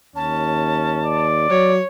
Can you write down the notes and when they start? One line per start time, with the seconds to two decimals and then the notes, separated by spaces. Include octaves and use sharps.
0.16 D#2 C#4 A5
1.04 D5
1.50 F#3 C#5